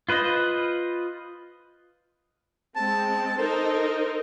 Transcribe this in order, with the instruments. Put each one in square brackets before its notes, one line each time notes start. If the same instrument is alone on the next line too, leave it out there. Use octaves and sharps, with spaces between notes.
[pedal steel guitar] F4 B4 C5 D#5
[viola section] G#3 C4 [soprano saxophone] A5
[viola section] D#4 A4 A#4 [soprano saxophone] C5